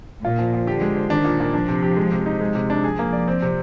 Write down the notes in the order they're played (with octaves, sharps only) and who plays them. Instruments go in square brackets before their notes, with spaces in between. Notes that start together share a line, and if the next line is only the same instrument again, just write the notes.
[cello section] A#2 [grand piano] F4
[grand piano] F3
F3
[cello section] D3 [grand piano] G4
[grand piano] G#3
C5
[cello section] D#3 [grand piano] D4
[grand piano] A#2
A#2
[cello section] F3 [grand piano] D4
[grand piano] C3
G4
G#3
C3
D#4
G#3
C3
D4
[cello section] F3 [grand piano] G#4
[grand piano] A#3
D5
C4
C3